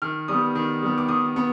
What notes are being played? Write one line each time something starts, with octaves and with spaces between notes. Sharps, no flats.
D#3 F6
G3 D#6
B3
D#3
G3 B3
D6
D#3 D#6
B3